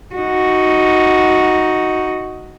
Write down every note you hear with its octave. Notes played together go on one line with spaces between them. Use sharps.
D#4 F#4